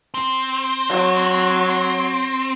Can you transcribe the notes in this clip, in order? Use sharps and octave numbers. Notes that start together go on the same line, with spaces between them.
C4
F#3